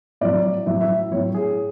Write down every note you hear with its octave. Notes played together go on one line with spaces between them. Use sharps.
A2 F#3 D5
A2 F#3 E5
E5
A2 F#3 C#5
G#4